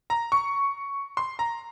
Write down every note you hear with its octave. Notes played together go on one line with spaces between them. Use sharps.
A#5
C#6
C6
A#5